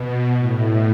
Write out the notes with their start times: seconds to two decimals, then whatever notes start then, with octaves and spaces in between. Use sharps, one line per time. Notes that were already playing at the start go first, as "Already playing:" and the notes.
Already playing: B2
0.37 A2